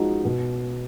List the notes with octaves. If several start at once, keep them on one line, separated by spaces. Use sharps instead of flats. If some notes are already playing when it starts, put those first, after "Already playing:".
Already playing: F3 G#3 D#4 F#4
B2